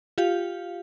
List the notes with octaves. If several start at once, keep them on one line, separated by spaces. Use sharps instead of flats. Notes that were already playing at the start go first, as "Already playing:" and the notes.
F4 G4 F5